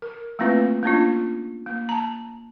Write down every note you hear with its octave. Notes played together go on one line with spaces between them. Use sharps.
A#4
A3 A#3 C4 E4 F4 B4
A#3 C#4 D4 E4 F4
A#3
A5 A#5